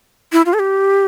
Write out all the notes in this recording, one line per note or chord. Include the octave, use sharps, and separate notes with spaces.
E4
F4
A4
G4